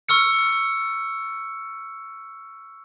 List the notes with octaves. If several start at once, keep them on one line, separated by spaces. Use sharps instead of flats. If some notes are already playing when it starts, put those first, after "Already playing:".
C#6 E6 F6 C#7